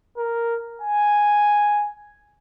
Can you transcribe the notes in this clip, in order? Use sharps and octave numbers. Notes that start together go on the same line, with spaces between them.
A#4
G#5